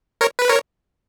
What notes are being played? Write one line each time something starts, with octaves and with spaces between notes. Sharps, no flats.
A#4 C#5
B4
A#4 C#5